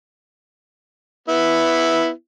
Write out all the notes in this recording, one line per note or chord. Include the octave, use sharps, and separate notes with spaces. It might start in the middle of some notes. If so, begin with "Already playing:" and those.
B3 E4